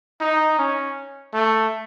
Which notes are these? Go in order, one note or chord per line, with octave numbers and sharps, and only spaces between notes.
D#4
C#4
A3